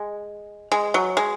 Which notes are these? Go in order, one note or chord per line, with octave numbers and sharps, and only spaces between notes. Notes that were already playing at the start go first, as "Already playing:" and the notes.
Already playing: G#3
G#3
F#3
G#3